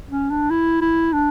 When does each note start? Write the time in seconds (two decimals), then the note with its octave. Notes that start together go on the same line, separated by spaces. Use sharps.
0.09 C#4
0.30 D4
0.50 E4
0.81 E4
1.12 D4